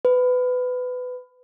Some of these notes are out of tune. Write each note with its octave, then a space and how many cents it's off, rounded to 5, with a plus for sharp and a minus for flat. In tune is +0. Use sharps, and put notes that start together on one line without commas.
B4 +20